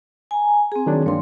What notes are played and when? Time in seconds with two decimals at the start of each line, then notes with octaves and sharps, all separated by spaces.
0.31 G#5 A#5
0.72 C4 G#4
0.86 D#3 F#3 D4
1.06 G2 A#3 C#5 C6